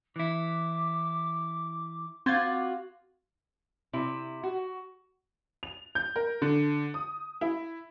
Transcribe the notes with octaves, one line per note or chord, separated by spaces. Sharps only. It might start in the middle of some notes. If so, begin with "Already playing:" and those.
E3 E4 D6
C4 F4 F#4 D6 G#6 A6
C3 E4
F#4
F7
G6
A#4
D3
D#6
E4